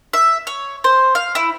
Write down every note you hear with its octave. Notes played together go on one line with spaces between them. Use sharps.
E5
C#5
C5
F5
E4